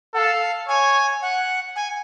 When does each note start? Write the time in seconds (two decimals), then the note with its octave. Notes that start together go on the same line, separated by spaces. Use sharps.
0.14 A4 F#5
0.18 F5
0.68 C#5 G#5
1.22 F#5
1.76 G#5